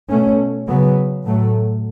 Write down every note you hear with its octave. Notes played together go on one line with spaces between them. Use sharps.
B2 A3 C#4
C#3 F#3 B3
A2 F#3 A3